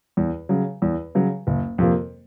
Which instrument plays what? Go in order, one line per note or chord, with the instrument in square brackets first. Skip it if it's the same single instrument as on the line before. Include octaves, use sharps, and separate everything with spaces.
[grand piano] E2
C#3 F#3
E2
C#3 F#3
F#1
F2 C3 F3 A#3